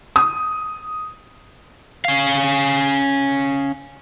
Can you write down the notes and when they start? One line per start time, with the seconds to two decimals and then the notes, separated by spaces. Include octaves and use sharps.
0.16 D#6
2.05 C#4 F5